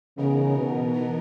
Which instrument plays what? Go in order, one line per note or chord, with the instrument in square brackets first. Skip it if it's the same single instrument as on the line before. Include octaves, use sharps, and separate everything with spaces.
[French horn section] C#3 [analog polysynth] E3 B3 D#4 A#4
[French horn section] B2
[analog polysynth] E3 B3 D#4 A#4